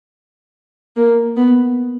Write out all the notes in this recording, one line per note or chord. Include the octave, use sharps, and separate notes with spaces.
A#3
B3